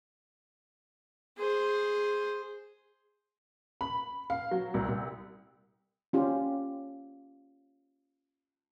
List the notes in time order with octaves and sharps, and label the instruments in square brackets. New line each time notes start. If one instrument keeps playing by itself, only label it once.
[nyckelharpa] G#4 C5
[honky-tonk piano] B5
F5
F#3
C2
C2
[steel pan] C#4 F4 G4